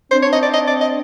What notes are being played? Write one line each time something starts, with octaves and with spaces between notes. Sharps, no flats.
C4 D4 C5
C#5
D#5
D5
D#5
D5
D#5